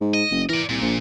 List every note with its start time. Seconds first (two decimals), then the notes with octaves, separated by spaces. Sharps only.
0.01 G#2
0.14 D#5
0.31 F#1
0.49 E3 A#4 D5
0.69 C2 A#2
0.81 A#1